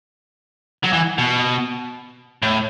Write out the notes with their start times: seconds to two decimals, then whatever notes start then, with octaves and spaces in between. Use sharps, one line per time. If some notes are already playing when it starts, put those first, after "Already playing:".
0.84 F#3
0.93 E3
1.18 B2
2.42 A2